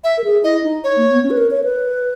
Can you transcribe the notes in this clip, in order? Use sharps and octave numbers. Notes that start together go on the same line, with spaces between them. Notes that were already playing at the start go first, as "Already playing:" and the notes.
E5
A#4
G#4
E4 D#5
D#4
C#5
A#3
B3
C#4
B4
A#4
C#5
B4